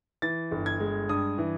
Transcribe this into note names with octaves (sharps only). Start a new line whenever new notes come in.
E3 A6
G1
G#6
G#3
G2 D#6
E3